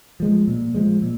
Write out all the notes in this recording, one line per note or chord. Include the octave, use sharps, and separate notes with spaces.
F3 G#3
A#2
F3 G#3
A#2